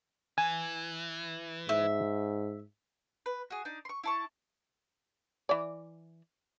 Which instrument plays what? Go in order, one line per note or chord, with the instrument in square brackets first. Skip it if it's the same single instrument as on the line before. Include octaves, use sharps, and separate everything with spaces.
[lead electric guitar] E3 [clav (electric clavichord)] G#5
[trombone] G#2 [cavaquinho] E5
[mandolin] B4
F#4 G#4
D4 D#4
C6 C#6
E4 A5 C#6
[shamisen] E3 D5